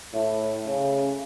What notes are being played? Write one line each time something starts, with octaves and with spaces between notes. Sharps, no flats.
A2
C#3